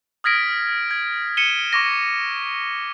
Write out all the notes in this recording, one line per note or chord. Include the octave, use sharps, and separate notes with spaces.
D#6 F6 G#6 A#6 B6 D7
G#6
C#7 D#7 E7 G7
C#6 D6 A#6